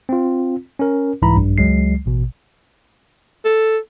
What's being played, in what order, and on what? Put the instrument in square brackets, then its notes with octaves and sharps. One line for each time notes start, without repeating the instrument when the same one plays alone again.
[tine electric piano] C4 F4
C#4 A#4
C2 G#2 E3 E4 A#5 B5
A#1 G2
C#2 F#3 G#3 C7
A1 B2
[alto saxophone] A4